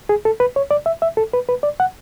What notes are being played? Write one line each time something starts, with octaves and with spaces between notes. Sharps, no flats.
G#4
A4
B4
C#5
D5
E5
E5
A4
B4
B4
D5
F#5